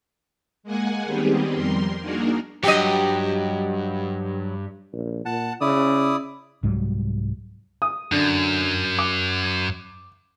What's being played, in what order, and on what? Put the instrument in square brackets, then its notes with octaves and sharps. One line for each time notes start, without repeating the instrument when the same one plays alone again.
[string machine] G#3 A#3 F#5 G#5
D#3 G3 B3 C4 G4 G#4
F2 G3 A#4 C6
A#3 D4 D#4 F#4 G#4 A#4
[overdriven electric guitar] G2 [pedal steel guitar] F#3 [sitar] G4 D#5
[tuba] A#1
[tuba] A#2 [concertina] F#5 A5
[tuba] C#3 [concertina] E4 D5 D#6
[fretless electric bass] C2 G#2 F#3 G3
[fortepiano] D#6
[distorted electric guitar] F#2 [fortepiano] D3
[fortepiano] D6